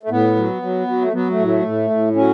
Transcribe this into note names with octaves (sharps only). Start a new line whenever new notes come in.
A3
A2 B3
F#3
F#3
F#3
A3
F#3 B3
A3
A2
A3
A2
A2
F#3 C#4